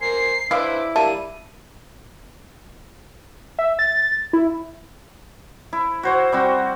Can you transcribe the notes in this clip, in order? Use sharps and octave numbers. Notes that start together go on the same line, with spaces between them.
A#4 C5 G#5 C7
G#3 D4 E4 B4 C5 F5 D6
G3 A#3 D4 D5 E5 A5 D#7
E5
A6
E4
E4
F#4 C5 C#5
G3 C4 F#4